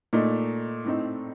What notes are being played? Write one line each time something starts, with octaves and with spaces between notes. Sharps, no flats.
A#2 A3 D#4
A2 A3 C4 D#4